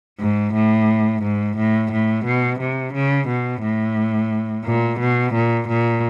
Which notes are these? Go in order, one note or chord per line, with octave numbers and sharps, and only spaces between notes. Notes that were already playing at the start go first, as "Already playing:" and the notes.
G#2
A2
G#2
A2
A2
B2
C3
C#3
B2
A2
A#2
B2
A#2
A#2